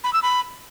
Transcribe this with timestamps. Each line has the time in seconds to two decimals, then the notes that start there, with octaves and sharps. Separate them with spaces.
0.04 B5
0.13 E6
0.22 B5